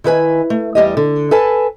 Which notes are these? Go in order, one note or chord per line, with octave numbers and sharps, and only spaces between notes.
D#3 E4 B4 G#5
A3
E2 G3 G4 D#5
D3
A4 B4 G#5 A5